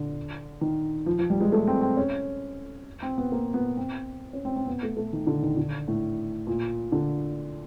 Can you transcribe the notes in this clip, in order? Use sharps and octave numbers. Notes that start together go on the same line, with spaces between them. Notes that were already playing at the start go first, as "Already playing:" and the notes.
Already playing: D3
D#3
F3
F3
G3
G#3
A3
C4
C4
C#4
C4
B3
A#3
B3
C4
C#4
C4
C4
B3
A3
A3
D#3
D3
D#3
D3
A2
A#2
D3